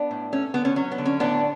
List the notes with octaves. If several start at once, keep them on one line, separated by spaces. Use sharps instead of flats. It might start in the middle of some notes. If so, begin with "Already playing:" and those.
Already playing: B3 D4
A2
A3 C#4
D3 B3
C#4
F#3 C#4
B3
D3
C#4
A2 B3 D4